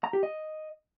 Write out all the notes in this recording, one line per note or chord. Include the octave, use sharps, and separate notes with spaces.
A#5
G4
D#5